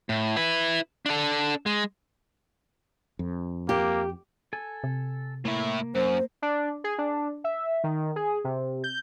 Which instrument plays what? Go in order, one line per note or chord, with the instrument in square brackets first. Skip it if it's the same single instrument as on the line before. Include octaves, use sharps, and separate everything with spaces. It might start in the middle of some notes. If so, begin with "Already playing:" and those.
[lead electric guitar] A2
E4 B4
D4 A4
G#3
[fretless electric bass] F2
[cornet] A#3 [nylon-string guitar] G4
[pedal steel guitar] A4 G#5
[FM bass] C3
[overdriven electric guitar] A2 E4 [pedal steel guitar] A#3
[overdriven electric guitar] F#2 [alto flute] C5
[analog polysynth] D4
G#4
D4
E5
D#3
G#4
C3
G6